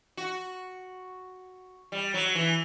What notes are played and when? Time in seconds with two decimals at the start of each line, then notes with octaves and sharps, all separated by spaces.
0.17 F#4
1.92 G3
2.14 F#3
2.35 E3